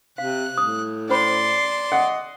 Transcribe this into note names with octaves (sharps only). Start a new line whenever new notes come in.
C3 F5 F#6
A2 D#6
C#4 C5 D5 B5 C6
D#5 F#5